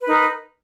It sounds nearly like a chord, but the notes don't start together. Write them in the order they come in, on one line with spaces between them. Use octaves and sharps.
B4 D#4 A#4